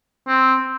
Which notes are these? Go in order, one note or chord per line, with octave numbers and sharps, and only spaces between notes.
C4